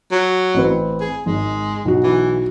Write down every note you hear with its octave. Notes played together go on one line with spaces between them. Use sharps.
F#3
A1 C4 B4
G#4
G#1 G#3
B1 F#4
E3